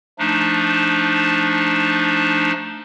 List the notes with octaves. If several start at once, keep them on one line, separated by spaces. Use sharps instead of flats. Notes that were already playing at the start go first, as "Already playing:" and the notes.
F3 A3 D4 D#4